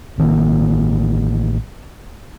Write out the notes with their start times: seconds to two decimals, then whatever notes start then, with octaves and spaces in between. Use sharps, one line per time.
0.18 A1 D#3 A3 A#3